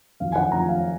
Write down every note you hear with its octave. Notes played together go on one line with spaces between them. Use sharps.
F2 D#3 F#3 F5
G#5
F#5
F2 D#3 F#3 A#5
F5